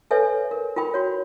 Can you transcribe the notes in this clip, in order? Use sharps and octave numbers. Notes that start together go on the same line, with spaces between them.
A4 B4 C#5 E5 G#5
A#4
F4 A#4 G5 B5
F#4 C#5